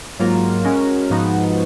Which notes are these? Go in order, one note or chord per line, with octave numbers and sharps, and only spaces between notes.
G#2 F#3 A#3 F4 A#4
G#3 C#4 F#4 A#4
G#2 F3 B3 D#4 F#4